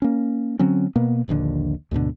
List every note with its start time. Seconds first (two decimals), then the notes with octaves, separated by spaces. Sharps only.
0.02 A#3 C#4
0.59 D3 F#3 C4 C#4
0.96 B2 A#3 B3
1.28 D#1 A#1 D#2 D3
1.91 D2 G#2 B2 D3